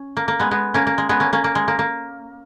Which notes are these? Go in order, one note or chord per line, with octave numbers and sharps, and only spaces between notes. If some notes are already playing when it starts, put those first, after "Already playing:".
Already playing: C#4
A#3
A#3
G#3 B3
G#3 B3
A#3 C#4
A#3
G#3
G#3 B3
A#3 C#4
A#3 C#4
A#3
G#3
A#3
A#3